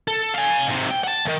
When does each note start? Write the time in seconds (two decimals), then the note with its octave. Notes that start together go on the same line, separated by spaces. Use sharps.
0.08 A4
0.34 F5 G#5
0.68 G#2 C3
0.91 G5
1.04 F#5 A5
1.25 D#2 D#3